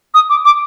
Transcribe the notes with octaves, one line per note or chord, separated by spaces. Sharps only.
D#6
D6
D6